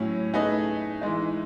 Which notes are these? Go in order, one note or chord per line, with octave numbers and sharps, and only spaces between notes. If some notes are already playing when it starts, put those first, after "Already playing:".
Already playing: A2 F#3 C#4 E4
A3 D#4 G#4 B4 D#5
E3 G#3 D#4